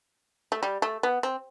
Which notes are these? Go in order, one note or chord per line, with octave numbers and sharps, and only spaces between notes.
A3
G3
A3
B3
C4